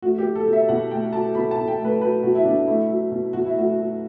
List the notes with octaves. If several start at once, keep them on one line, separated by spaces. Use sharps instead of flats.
A3 F#4
G4
F#3
A4
B2
E5
B2 F#5
A3 G5
F#3 A5
B2 B5
A5
B2
G5
A3
B4
F#3 B4
B2 F#4
E4
B2 D4
A3 E4
F#3
B2
B2 F#4
E4
A3 F#4
F#3